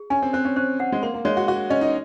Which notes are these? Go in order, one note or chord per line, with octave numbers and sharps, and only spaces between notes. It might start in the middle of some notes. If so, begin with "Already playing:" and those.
Already playing: G#4
C#4 G#5
C4
C4 C5
C#4
C#4 C5
C4 F#5
G#3
A#3 C6
A#3
G#3 C#5
F#4
F#4 C#6
C#4 D#5
D#4